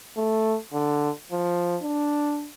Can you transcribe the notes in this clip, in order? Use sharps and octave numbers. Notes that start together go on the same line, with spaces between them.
A3
D3
F3
D4